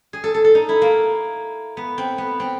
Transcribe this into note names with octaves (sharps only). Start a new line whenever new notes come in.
G#4
A4
A4
A4
D#4
E4
A#3
B3
C4
B3
C4